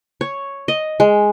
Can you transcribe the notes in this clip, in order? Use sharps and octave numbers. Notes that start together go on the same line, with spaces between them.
C#5
D#5
G#3